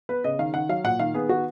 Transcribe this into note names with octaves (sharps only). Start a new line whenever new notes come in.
B3 B4
C#3 D#5
D#3 F5
D#3 F#5
F#3 F5
A#2 F#5
D#3 F5
B3 G#4
D#3 F#4